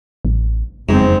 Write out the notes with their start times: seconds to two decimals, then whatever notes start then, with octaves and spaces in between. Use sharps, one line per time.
0.25 A1
0.89 F#1 F2 G#2 C4